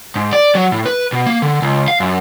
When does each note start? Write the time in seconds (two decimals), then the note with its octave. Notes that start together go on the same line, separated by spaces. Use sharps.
0.16 G#2
0.33 D5
0.55 F#3
0.72 A2
0.86 B4
1.13 B2
1.26 A#3
1.42 D3
1.62 C#2
1.88 F5
2.00 F#2